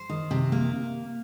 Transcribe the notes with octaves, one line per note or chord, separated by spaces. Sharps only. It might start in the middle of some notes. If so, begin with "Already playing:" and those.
Already playing: C5
D#3
C3
A#3